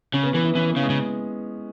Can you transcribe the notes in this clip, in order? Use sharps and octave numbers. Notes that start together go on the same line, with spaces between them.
C#3 C#4
B3
E3 B3
E4
E3 C#4
B3
C#3
G#3
C#3